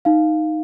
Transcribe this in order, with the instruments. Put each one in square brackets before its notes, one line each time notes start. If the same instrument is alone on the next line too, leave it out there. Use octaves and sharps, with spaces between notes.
[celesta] D#4 F5